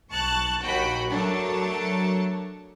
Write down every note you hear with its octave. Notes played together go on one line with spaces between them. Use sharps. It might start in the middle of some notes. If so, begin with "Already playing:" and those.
B1 A5 C#6 F#6 A6
A#1 D#2 F#4 G5 B5
F#3 A3 D4 A#4 C#5 A5